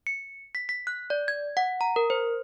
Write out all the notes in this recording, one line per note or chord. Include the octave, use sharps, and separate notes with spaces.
C#7
B6
B6
F#6
D5
G#6
F#5
A#5
A#4
C5